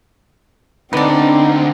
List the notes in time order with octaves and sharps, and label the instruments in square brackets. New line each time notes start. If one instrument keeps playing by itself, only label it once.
[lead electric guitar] D2 D3 [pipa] B3 D4 [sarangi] C4 [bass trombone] D#4